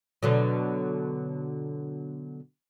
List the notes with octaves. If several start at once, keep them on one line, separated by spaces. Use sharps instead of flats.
B2 D3 F#3